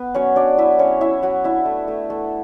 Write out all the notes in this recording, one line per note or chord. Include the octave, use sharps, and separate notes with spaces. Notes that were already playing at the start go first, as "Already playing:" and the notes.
Already playing: B3 B4
F#3 C#4 C#5
F#3 D4 D5
F#3 E4 E5
F#3 C#4 C#5
C#4 E4 E5
F#3 F#4 F#5
D4 E4 E5
A3
A3
A3